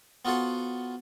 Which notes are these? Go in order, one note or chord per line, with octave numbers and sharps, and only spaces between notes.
B3 F4 F#4 A4 C5